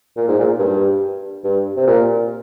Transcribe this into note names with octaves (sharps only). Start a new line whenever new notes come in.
A#2
G#2
A#2
G2
G2
C3
A#2